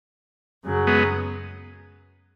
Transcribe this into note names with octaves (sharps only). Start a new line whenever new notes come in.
F#2 C#3 F#3
G#3 B3